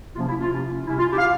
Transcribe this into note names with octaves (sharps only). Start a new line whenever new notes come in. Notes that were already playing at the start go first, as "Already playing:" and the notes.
C3 F3 A#3 C#4 F4
E4
F4
C3 F3 A#3 C#4
C3 G3 C#4 E4
F4
E4 G4
F5